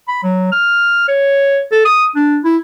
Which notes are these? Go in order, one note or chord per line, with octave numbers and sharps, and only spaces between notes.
B5
F#3
F6
C#5
A4
D#6
D4
E4